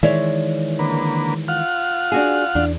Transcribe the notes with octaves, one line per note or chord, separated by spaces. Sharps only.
D#3 E3 G#3 C#5 D5 E5
D3 A#3 B4
F4 F5 F#5
D4 F#4 G#4
E2 D4